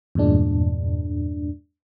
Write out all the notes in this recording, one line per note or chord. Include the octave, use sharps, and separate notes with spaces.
E2 G2 A#2 G#3 D4